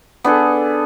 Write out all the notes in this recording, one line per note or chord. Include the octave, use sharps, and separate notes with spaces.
B3 D4 G#4 A4